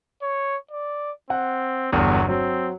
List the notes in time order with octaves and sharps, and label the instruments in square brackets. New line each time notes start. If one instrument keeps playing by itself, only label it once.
[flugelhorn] C#5
D5
[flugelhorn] C4 [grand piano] F#5
[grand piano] G1 E2 [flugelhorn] F#3
[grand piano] F#3 [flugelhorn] C4